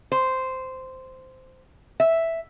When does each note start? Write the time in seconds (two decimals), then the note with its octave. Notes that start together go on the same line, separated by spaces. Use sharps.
0.12 C5
2.00 E5